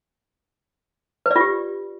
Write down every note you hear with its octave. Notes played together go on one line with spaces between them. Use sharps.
F4 G4 B4 D5